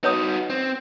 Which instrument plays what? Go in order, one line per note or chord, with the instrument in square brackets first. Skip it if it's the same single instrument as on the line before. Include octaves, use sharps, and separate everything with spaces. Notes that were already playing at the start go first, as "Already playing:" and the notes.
[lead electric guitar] D#4 F#4 [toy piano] B4 C#5 D#6
[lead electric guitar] C4